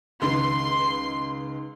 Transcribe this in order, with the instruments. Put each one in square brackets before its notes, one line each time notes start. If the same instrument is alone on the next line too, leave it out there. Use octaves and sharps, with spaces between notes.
[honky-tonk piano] C#2 D#3 B4 [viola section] C6